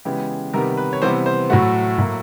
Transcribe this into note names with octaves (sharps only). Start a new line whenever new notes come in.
C#3 E3 G#3 B3 G4
C3 D#3 G3 B3 A#4
B4
C#5
C3 E3 G3 B3 C5
C5
A2 F#3 A3 F#4
A2 F#3 A#3